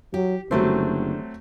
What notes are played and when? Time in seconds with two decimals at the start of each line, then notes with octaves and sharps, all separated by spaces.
0.14 F#3 G4
0.51 F#1 D3 F#3 G3 A3 C4 D4